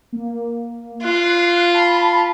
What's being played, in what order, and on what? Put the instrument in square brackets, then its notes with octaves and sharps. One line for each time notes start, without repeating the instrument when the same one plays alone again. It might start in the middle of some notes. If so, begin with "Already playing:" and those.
[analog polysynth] A#3
[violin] F4 [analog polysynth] F#6 C7
[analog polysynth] A5 B5